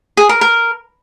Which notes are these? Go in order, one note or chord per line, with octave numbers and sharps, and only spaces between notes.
G#4
A#4
A#4